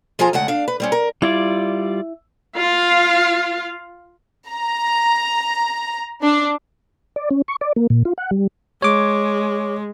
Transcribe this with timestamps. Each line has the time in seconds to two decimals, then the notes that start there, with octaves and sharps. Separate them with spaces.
0.19 F3 F4 G#4 A4 G#5 A#5
0.33 E2 C#3 G#3 A3 F#5
0.48 D4 F5
0.68 B4
0.80 G3 C4 C#4
0.92 A#4
1.22 G3 E4 F4 D5
2.57 F4 F5
4.50 A#5
6.23 D4
7.16 D5
7.31 C#4
7.48 C#6
7.61 D5
7.76 A#3
7.90 A#2
8.05 F4
8.18 F#5
8.31 G3
8.82 G#3 C#5 D6